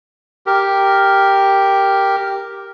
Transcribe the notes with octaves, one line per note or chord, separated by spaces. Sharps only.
G4 A#4